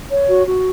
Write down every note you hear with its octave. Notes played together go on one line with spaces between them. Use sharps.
C#5
F#4
F#4